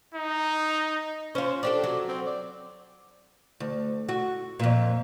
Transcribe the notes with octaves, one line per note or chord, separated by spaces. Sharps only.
D#4
C#4 F4 C5
D4 G4 A4 D5
F#3
C4
D5
D2
F#4
F2 A#2